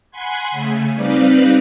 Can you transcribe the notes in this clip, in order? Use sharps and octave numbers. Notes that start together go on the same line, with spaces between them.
F#5 G#5 B5 C6 G#6
C#3 A3 G#5
G3 C4 D#4 B4 D5 F5